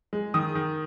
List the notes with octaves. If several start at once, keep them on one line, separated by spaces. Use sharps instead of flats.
G#3
D#3 D#6
D#3